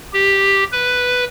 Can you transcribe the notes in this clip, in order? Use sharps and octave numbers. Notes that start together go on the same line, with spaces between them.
G4
B4